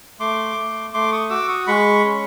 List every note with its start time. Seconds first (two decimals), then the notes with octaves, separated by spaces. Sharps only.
0.20 A3 C6 D6
0.57 A3
0.94 A3 C6 D6
1.12 C#6 D#6
1.30 F#4 D6 E6
1.48 C#6 D#6
1.67 G#3 B5 C#6
2.04 C#4